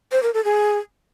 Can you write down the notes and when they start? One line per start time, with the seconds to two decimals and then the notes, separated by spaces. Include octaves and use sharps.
0.12 C5
0.23 A#4
0.34 A4
0.45 G#4